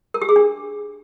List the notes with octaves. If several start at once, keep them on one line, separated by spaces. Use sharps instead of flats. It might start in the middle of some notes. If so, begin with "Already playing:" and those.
A#4
G4
G#4
D4